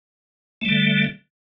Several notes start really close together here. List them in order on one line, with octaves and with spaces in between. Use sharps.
A3 G3 D3